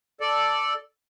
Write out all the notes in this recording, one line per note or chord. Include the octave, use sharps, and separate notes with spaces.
A4 D5